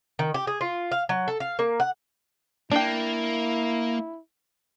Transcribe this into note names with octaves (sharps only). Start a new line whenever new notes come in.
D#3
G4
G#4
F4
F5
F#3
A4
F5
A#3
F#5
A#3 D4 E4 G5